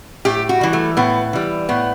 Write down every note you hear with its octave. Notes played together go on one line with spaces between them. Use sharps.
A2 G4
F#4
E3 G3
A3
A2 B3
E3 G3
A2 B3